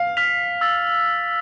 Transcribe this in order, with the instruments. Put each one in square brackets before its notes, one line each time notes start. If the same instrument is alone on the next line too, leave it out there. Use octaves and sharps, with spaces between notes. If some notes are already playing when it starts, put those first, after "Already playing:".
Already playing: [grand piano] F5
[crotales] F6 B6 F7
E6 A6